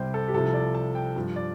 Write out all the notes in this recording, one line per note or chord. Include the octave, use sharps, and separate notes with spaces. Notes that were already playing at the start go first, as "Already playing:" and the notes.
Already playing: C2 C3 G3 C5 G5
A4
G4
C2 C3 F3 A4
D5
A5
G5
G2 F3
D5